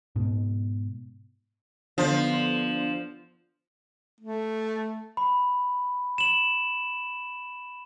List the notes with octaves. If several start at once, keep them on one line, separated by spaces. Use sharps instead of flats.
G#2 B2
D3 F3 B3 C6
A3
B5
E7 F#7